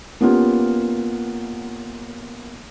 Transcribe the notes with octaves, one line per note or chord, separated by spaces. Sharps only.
A#3 B3 C#4 F4 G4